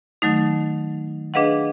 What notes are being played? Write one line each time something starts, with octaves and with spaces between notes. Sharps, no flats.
D#3 F#3 A3 D#4
D4 G#4 B4 D#5 F5 F#5